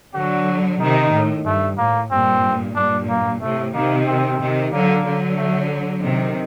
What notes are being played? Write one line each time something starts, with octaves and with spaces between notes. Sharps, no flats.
D3 F#3 F#4
C3 D#3 D#4
A2
G2 A3
A2 A#3
G2 A#2 C4
G2 A#2 D4
A#3
A2 C3 A3
C3 D#3 A#3
C4
C3 D#3
D3 F#3 A#3
D3 F#3
A3
C3 D#3